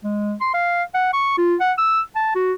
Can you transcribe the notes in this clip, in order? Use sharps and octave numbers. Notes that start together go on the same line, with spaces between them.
G#3
C6
F5
F#5
C#6
F4
F#5
E6
A5
F#4